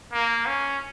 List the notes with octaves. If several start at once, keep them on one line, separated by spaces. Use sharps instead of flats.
A#3
C#4